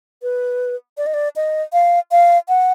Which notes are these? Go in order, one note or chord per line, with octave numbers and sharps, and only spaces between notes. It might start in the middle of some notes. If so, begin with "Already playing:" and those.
B4
D5
D#5
D5
D#5
F5
F5
F#5